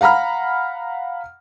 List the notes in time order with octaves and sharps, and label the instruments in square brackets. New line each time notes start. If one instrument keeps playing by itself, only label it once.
[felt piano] F5 F#5 A#5 B5 F6